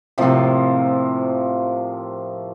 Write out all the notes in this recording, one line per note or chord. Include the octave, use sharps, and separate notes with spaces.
A2 C3 F3 A#3